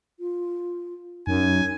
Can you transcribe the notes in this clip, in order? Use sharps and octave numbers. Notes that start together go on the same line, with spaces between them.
F4
F#2 D#4 G#5